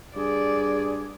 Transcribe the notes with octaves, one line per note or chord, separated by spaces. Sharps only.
G2 G#4 D5